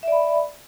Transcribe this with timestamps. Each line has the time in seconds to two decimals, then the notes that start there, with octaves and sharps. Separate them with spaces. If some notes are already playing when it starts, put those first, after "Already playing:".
0.03 E5
0.08 D5
0.12 B5